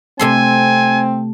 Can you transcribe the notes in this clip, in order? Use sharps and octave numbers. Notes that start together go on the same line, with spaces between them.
C3 A3 C4 A4 G#5 C6